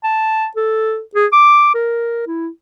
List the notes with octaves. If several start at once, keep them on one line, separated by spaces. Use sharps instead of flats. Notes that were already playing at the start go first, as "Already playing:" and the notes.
A5
A4
G#4
D6
A#4
E4